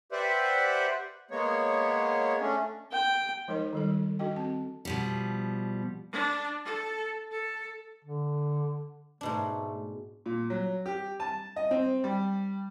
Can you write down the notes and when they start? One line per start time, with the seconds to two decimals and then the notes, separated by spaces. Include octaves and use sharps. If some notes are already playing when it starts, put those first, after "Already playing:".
0.12 G4 B4 C5 D5 E5 F#5
1.31 G#3 A#3 B3 C#5
2.40 A3 C#4 D4
2.92 G5
3.48 F3 G#3 D#4 A#4 C#5 D#5
3.73 D#3 G3 A4
4.19 D4 F#4 A4 D#5 G5
4.36 C4 A5
4.85 B2 F3 G3
6.12 D4
6.65 A4
7.31 A4
8.05 D3
9.21 G#2 B2 A3 D4
10.26 A#2
10.50 F#3
10.86 G4
11.20 A5
11.56 D#5
11.71 C4
12.04 G3